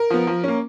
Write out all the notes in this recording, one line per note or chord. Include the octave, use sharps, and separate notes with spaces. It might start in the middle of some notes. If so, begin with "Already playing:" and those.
Already playing: A#4
F3 B3
F3
A#3 C#4